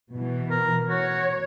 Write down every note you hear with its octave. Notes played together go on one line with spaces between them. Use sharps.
B2 E3
A#4
F#4 C#5